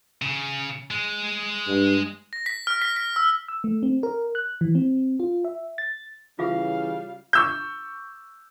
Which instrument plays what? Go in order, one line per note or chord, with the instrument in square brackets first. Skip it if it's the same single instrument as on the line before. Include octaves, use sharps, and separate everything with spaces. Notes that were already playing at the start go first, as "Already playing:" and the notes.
[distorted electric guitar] C#3
G#3
[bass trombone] G2
[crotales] A#6
B6
F6
B6
B6
E6
[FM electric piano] E6
A3
C4
A#4
F#6
E3
C4
F4
E5
A6
[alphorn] C#3 [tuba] E3 [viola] G3 F5 [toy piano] F4 G#4 E5
[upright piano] C#6 E6 G6